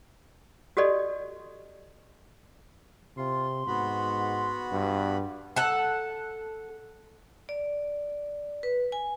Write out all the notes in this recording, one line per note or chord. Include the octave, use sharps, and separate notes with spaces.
F#4 G4 A4 D5 D#5
C3 F4 C6
G#2 B3 F#4 B5
G2
A4 F#5
D5
B4
G#5